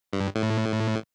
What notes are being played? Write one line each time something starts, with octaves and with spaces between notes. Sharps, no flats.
G2
A2